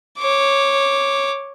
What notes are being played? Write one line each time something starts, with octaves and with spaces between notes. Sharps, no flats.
C#5 D6